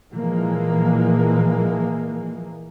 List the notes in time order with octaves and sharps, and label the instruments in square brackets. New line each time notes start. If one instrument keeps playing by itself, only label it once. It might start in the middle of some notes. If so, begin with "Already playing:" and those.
[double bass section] A#2 E3 F3 G#3 A#3